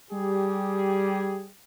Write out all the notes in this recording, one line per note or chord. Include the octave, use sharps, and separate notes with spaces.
G3 G4 G#4